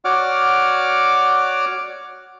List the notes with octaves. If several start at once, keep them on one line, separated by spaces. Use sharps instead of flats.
F#4 C#5 D5 F#5 D6 F6